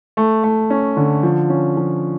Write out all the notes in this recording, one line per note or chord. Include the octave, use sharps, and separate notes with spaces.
A3
A3
C#4
D3
F3
C#4
F3